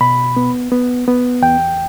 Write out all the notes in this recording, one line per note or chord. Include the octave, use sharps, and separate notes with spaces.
B2 B5
B3
B3
B3
E2 G5